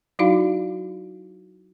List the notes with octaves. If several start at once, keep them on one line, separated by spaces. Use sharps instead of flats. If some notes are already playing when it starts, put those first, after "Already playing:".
F#3 D#4 E4 F#4 F5